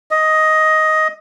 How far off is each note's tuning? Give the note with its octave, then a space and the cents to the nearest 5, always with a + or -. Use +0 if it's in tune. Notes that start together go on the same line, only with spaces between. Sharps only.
D#5 +10